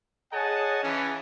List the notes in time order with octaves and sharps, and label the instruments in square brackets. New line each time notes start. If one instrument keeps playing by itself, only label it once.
[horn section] G#4 C#5 D#5 F#5 G#5 A5
C#3 E3 C#4